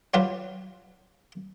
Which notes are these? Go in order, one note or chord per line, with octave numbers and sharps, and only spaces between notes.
F#3 G3 F4 G4 B4